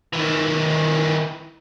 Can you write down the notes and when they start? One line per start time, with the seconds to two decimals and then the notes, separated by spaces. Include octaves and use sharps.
0.13 D#3 E3